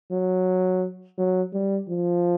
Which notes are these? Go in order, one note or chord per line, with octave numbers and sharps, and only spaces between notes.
F#3
F#3
G3
F3